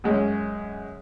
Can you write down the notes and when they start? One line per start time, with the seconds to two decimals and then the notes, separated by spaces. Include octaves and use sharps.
0.04 F#2 G#3 C#4